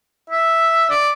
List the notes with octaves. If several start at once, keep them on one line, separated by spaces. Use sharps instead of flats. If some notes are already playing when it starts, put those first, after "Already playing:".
E5
D5